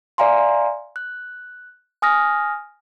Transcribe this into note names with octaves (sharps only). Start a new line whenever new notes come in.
D5 E5 F5 G#5 A#5 C6
F#6
G#5 D#6 F6 A#6